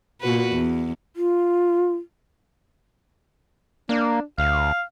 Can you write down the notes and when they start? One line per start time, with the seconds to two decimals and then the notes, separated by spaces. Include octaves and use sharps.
0.21 A#2 F#4 B4
0.52 E2
1.16 F4
3.89 A#3 D4
4.38 D2 F5